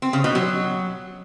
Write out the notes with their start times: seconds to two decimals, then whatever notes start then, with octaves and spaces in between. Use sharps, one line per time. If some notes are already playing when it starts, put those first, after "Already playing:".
0.02 C4
0.13 C#3
0.24 B2
0.35 F#3